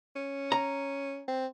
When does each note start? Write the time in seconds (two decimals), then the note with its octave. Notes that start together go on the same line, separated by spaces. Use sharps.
0.16 C#4
0.52 A#5
1.28 C4